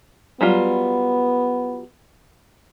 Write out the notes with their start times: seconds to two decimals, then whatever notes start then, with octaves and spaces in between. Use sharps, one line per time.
0.41 F#3 G3 B3 F4